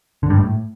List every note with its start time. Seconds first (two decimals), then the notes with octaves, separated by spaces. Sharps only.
0.23 D3
0.30 G2
0.37 A2